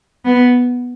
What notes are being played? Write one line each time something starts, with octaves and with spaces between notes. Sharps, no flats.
B3